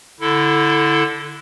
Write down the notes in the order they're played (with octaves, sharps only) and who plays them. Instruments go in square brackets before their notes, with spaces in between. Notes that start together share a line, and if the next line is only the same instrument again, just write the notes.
[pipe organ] D3 E4 A4